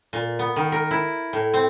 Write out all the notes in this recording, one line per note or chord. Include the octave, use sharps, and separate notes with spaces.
A#2
B3
D#3
A#4
E4
A2
C4